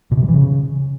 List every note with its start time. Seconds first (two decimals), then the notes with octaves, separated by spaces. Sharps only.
0.11 B2
0.17 C3
0.23 F#3
0.28 E3
0.34 C#3